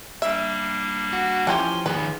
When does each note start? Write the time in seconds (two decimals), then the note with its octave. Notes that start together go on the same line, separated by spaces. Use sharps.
0.22 G3 A#3 D4 E5
1.13 F#4
1.47 E3 F3 C#4 G4 G#5 C6
1.86 D#3 F3 B3 G#4 B4